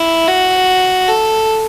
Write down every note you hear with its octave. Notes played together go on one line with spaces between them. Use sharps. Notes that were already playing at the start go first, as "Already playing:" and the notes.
Already playing: E4
F#4
A4